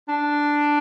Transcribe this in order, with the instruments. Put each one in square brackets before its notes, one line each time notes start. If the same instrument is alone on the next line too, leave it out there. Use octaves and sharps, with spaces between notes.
[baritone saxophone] D4